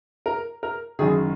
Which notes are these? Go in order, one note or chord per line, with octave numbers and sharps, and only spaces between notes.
A#4
A#4
F#1 F#2 D#3 G#4